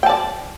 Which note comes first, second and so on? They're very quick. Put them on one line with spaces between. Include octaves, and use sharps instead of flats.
G5 A5 D5